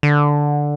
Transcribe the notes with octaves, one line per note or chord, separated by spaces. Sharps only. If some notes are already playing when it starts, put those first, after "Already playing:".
D3